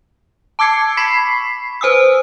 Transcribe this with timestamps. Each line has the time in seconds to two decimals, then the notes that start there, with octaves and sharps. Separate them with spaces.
0.59 A5 D6 E6 G#6 C7 C#7
0.97 B5 C#6 B6 C7
1.81 B4 C5 G#5 D#6 E6